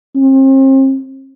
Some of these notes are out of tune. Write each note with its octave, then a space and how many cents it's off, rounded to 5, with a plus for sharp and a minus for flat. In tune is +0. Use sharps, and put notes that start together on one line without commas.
C4 +40